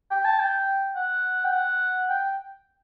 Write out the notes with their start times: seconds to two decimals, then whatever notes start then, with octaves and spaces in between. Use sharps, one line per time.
0.11 G5
0.25 A5
0.39 G5
0.95 F#5
1.44 G5
1.52 F#5
2.09 G5